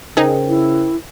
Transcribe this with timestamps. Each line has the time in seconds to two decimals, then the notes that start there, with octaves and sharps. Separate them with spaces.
0.17 C#3 D#4 G#4 A#4 C5 G5
0.49 E4